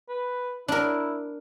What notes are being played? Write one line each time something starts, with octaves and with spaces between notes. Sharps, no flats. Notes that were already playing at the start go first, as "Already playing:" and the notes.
B4
D4 E4 A#4